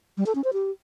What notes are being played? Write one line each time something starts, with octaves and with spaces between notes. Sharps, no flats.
G3
A4
C#4
C5
G4